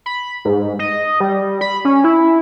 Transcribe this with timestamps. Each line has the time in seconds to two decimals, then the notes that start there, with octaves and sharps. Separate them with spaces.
0.06 B5
0.45 G#2
0.79 D#5
1.20 G3
1.61 B5
1.85 C#4
2.04 E4